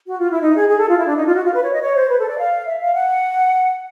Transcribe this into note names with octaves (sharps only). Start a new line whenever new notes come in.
F#4
F4
E4
D#4
G#4
G#4
A4
F4
E4
D4
D#4
F4
F#4
F4
B4
C#5
D#5
C#5
C5
B4
A4
D5
F5
E5
F5
F#5